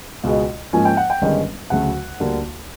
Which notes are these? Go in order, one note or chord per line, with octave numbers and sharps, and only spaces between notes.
C#2 B2 G#3
G#2 F3 A#3 C#4 G#5
G5
F#5
G5
G1 G2 D#3 G#3 C#4
D2 C#3 F#3 A3 F#5
D2 D3 G3 A#3